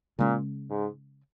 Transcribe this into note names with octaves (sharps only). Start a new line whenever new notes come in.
A#2 C#3 G#3 C#4
G#2